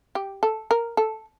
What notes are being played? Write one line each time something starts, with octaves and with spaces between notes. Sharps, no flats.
G4
A4
A#4
A4